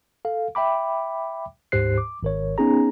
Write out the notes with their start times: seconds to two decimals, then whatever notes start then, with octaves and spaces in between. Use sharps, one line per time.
0.25 A4 F5
0.55 E5 G5 B5 D6
1.72 D2 G#2 G4 C5 F#6 C7
1.98 D6
2.23 G#1 A#4 C#5
2.58 B3 C#4 D#4 G#4 A#5